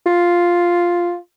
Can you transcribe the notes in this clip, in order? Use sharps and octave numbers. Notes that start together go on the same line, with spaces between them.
F4